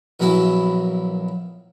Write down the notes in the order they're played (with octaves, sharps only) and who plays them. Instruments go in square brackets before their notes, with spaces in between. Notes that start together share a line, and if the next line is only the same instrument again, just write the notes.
[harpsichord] A#1 F#2 B3 E4 E5